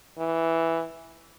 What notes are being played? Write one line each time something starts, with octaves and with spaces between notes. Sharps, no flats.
E3